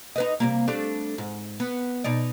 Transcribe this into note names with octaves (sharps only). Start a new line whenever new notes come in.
D#4 B4 D#5
C3 G3 A#3
G3 A3 D4
G#2
B3
B2 D#4 D5